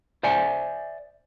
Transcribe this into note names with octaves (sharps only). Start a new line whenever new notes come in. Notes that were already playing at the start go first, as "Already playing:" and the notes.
C5 D5 E5 G#5